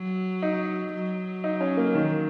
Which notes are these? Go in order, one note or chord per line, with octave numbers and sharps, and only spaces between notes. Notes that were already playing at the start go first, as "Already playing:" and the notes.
Already playing: F#3
D#4
F#3
D#4
C#4
A#3
D#3